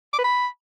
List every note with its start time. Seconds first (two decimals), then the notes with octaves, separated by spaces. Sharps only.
0.13 D6
0.18 B4
0.24 B5